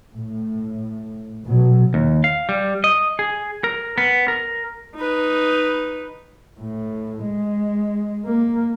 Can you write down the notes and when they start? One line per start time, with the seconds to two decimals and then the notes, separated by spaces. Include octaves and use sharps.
0.15 A2
1.46 B2 F#3
1.94 D#2
2.24 F5
2.49 G3
2.84 D#5
3.19 G#4
3.64 A#4
3.98 B3
4.28 A#4
4.95 D#4 B4
6.60 A2
7.23 G#3
8.26 A#3